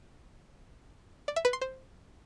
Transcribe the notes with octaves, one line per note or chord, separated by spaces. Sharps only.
D5
E5
B4
C6
C5